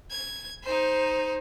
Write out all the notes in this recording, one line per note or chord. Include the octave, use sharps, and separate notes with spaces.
G#6
D#4 C5